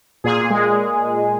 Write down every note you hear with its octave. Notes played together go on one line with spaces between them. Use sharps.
A#2 G#4
G#3